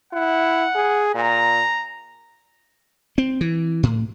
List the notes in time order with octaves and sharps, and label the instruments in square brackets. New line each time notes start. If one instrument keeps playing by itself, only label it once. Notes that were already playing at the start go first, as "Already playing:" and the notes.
[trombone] E4 [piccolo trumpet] F#5
[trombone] G#4
[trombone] A#2 [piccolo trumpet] A#5
[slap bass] C4
E3
A2